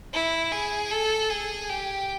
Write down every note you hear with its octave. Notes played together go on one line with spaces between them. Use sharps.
E4
G#4
A4
G#4
G4